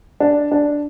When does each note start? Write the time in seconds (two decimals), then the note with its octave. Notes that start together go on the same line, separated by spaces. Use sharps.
0.20 D4
0.52 D4